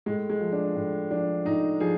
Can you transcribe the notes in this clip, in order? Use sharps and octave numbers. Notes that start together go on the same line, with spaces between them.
A2 G#3
G#3
F3
D4
A2
F3 D4
A2 D#4
F3 G#4